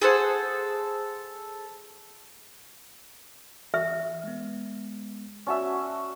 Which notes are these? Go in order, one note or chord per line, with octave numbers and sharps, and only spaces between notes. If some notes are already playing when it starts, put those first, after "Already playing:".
G#4 A4 C5 F#5
E3 E5
G#3 B3
C#4 F#4 D5 E5 A5